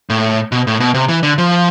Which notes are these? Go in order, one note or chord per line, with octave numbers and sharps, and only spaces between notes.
A2
B2
A2
B2
C3
E3
D3
F3